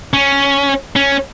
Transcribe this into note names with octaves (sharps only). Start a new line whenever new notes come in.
C#4
C#4